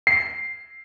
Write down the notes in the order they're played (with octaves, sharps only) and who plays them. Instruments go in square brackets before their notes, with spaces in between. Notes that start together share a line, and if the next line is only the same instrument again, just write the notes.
[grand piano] C7